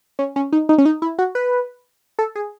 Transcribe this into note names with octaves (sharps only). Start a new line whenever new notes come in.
C#4
C#4
D#4
D#4
C#4
D#4
E4
F#4
B4
A4
G#4